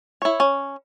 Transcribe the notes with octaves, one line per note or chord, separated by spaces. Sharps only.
E4 C#5
C#4